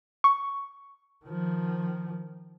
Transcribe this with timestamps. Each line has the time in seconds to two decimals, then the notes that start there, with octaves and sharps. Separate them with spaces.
0.24 C#6
1.25 D#3 F3